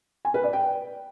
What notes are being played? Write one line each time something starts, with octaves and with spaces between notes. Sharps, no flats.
G#5
B4
D5
G5